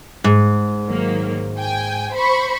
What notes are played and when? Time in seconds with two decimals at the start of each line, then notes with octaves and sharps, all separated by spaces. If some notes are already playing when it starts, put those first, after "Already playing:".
0.24 G#2
0.87 D#3 F#3 A#3
1.59 G5 G#5
2.14 C5 B5 C#6